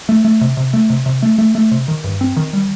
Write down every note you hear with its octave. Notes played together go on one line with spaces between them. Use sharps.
A3
A3
C3
C3
A3
C3
C3
A3
A3
A3
C3
D#3
G2
C4
D#3
G3